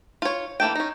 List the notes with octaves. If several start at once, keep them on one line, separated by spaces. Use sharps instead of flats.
F4 C#5
E3 A#3 A4 G5
C#4 D#4